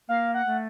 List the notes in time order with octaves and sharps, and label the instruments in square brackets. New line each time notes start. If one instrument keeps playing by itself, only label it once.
[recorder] A#3 [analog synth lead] F5
[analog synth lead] F#5
[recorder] A3